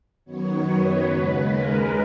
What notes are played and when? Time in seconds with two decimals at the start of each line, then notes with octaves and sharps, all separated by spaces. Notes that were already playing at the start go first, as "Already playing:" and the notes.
0.25 F#2 D#3 F#3 B3 C#5
0.65 B4
1.04 D#2 C#3 G#3
1.44 A#4